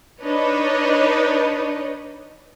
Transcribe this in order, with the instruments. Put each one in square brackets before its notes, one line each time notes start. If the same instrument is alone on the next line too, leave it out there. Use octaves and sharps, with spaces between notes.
[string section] D4 D#4 B4 C#5 D#5